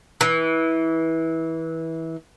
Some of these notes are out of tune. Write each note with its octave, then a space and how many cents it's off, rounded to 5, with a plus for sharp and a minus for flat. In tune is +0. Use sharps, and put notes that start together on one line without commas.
E3 -20